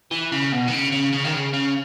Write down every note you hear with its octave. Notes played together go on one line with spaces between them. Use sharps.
E3
C#3
B2
D#3
C#3
C#3
C#3
D#3
C#3
C#3